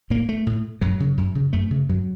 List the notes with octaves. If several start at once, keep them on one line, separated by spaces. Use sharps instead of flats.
A2 A#3
A3
A2
F#2 F#3
C#3
F#2
C#3
F#2 A3
C#3
F#2 F#3